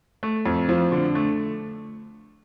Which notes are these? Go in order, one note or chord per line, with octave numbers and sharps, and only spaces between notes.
A3
F2
F3
D3
A3